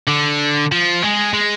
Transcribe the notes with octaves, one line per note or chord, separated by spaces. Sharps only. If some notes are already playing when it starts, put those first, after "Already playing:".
D3
F3
G#3
G#3